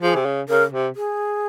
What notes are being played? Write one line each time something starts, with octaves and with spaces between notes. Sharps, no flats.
F3 G#4
C3
C#3
C#3 A#4
C3
G#4